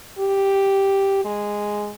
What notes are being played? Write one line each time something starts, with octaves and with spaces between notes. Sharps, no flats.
G4
G#3